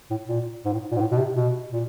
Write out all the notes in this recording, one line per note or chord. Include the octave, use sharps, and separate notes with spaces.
A2
A#2
G#2
A2
A#2
G#2
A2
B2
C3
B2
A#2